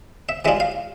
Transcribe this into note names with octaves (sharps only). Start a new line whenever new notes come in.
E5
E3 G#3 D4 F4 E5
F5